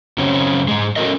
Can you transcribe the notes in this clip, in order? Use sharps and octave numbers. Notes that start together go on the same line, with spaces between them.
F#2 C#3 C4 C#4
G#2 G#3
C#4 F#4 A4 A#4 D#5